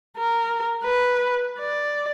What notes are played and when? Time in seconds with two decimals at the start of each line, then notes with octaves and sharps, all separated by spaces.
0.18 A#4
0.84 B4
1.59 D5